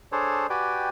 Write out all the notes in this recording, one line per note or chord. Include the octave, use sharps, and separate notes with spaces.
D4 G#4 A4 C5 C#5
F#4 G4 B4 D5 G5 G#5